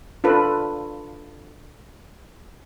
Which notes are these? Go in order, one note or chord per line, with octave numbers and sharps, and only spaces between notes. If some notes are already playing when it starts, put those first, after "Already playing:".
D4 F4 A4 B4